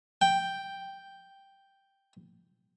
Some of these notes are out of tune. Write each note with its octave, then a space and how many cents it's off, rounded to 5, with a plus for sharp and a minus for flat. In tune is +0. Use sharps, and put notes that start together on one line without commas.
G5 +0